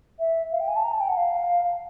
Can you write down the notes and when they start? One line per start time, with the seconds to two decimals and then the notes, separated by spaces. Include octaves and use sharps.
0.19 E5
0.52 F5
0.60 G5
0.68 G#5
0.76 A5
0.84 A#5
0.92 A5
1.00 G5
1.08 F#5
1.17 F5